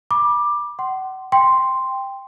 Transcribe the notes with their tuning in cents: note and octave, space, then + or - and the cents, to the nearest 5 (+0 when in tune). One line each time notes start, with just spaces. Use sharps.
B5 -30 D6 +15
F#5 +35 C6 +0
G5 +10 C6 -5